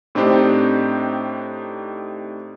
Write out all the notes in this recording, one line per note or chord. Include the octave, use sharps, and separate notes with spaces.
A2 C4 D4 D#4 G4 C5